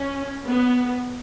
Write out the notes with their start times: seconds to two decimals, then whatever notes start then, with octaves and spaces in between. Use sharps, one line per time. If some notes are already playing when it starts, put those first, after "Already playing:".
Already playing: C#4
0.45 B3